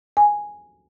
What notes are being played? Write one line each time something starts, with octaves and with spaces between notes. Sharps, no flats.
G#5